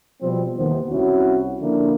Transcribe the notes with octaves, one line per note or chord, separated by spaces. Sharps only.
B2 F3 G3 C4
D#2 D#3 E3 B3 C5
C2 C#4 E4 F#4
D3 F3 A#3 D4 E4